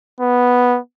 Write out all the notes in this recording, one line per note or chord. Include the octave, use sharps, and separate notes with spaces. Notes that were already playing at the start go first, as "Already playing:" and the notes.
B3